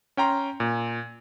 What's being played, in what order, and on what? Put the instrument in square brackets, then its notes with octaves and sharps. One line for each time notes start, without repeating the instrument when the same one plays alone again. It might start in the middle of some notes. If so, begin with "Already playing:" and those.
[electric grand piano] C#4 G5 A#5 C6
A#2